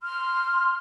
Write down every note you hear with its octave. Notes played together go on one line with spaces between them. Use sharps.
C6 F6